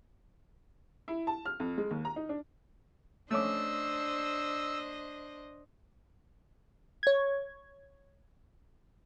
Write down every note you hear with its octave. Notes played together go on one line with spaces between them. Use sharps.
E4
A5
F6
F2
G#3
D#2
A#5
D#4
D4
A3 C#4 D4 C5 D#5 D6 E6
C#5 G#6